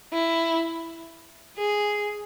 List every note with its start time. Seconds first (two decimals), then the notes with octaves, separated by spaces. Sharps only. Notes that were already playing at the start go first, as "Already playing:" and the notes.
0.12 E4
1.57 G#4